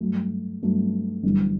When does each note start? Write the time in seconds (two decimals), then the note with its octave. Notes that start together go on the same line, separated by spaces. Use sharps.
0.01 G2 F#3 A3
0.62 G2 F#3 A3
1.23 G1 F#2 E3 G3